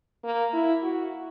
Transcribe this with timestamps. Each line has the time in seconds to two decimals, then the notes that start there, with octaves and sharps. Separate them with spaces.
0.23 A#3
0.53 E4
0.83 F#4